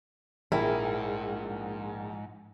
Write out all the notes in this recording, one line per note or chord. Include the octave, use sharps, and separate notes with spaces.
A#1 G#2 E4 G#4 A#4 G5